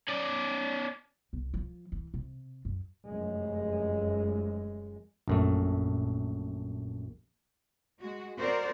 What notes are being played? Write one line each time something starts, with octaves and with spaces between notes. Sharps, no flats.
C#4 D5
C2
F3
E3
C3
F#2
F1 F#2 G#3
A#1 F#2 A3
G#3 F#4
C4 F#4 A#4 C5 D5